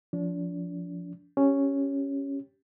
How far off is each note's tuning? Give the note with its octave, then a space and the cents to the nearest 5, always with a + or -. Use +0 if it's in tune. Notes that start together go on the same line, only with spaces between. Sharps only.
F3 +0 D4 -35
C#4 +0 G4 +0